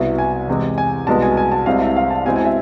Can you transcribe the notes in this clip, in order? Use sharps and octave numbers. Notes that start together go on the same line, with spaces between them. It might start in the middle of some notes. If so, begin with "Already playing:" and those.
Already playing: C2 B2 B3 E4 E5
G#5
E2 C3 G#3
G#5
C2 B2 G#3 B3 A5
G#5
G#5
A5
C2 C3 G#3 C4 E4 F5
E5
F5
A5
B2 G#3 C4 E4 G#5
G#5
E5